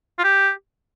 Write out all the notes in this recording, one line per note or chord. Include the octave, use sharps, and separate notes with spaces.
F4
G4